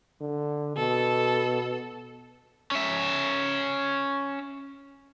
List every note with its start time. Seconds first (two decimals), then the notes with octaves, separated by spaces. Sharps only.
0.21 D3
0.77 B2 A4
2.72 C#4 E5